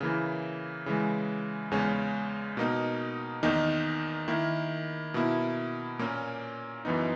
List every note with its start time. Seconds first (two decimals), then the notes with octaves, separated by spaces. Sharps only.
0.01 C#3 E3 A#3 E4
0.86 C#3 E3 G#3
1.71 E2 C#3 G#3 C#4
2.57 B2 A#3 D#4
3.43 E2 D#3 A#3 D#4
4.28 D#3 A#3 E4
5.14 B2 A#3 E4
5.99 A#2 A#3 C#4
6.85 F#2 E3 B3 D#4